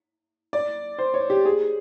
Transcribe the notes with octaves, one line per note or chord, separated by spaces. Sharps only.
D5
C5
C#5
G4
G#4